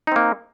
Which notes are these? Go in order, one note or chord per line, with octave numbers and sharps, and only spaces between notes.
A#3 C4 D#4